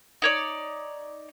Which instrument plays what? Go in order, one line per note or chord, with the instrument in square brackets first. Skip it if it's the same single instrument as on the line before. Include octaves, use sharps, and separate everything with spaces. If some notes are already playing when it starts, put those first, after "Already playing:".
[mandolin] D#4 C#5 D5